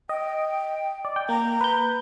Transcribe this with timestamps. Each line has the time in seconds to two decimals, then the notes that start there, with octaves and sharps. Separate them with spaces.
0.09 D#5 G5
1.05 D5
1.16 G5
1.29 A#3 A#5
1.61 B4 G6